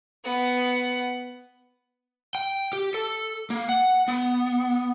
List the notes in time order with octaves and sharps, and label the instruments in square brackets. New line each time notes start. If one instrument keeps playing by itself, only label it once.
[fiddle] B3 F#5
[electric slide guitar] G5
G4
A4
A#3
F#5
B3